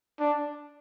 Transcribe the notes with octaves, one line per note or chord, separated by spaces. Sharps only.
D4